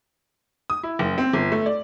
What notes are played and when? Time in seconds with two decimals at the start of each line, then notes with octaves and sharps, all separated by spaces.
0.70 D#6
0.83 E4
0.99 F#1
1.18 C4
1.33 G1
1.52 A3
1.66 D5